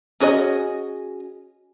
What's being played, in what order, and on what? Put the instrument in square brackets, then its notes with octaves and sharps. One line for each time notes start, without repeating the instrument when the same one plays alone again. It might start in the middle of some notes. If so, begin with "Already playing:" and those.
[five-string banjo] C#4 F#4 G#4 C5 D#5